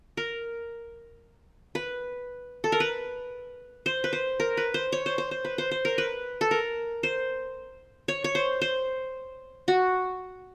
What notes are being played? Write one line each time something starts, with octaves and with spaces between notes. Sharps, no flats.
A#4
B4
A4
A#4
B4
C5
B4
C5
A#4
B4
C5
C#5
C5
C5
C5
B4
C5
C5
A#4
B4
A4
A#4
C5
C#5
C#5
C5
C5
F#4